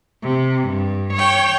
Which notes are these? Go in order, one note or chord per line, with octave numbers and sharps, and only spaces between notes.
C3
G2
C#5 G5